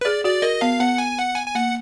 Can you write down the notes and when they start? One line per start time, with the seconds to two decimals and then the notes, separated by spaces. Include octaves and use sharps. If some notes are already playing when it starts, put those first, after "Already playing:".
0.01 B4
0.05 G#4 D5
0.24 F#4 D5
0.42 A#4 D#5
0.61 B3 F5
0.80 B3 F#5
0.98 G#5
1.18 F#5
1.36 G#5
1.47 G#5
1.55 A#3 F#5